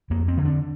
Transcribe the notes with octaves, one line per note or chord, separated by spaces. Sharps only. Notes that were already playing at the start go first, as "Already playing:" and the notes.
F2 A#3
C4
D3
D4